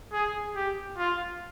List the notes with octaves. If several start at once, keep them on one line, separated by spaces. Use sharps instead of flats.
G#4
G4
F4